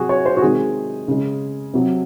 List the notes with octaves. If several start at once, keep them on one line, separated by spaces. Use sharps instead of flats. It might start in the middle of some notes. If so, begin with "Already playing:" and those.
Already playing: C3 F#3 F#4 G#4
C#5
C5
F#4
C3 D#3 G#3 G#4
C#3 G#3
C3 F#3